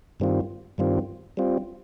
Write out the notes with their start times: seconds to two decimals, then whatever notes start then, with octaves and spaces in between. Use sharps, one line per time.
0.20 G2 D#3 G3 C4 F4
0.78 G2 D#3 G3 C4 F4
1.37 G3 C4 F4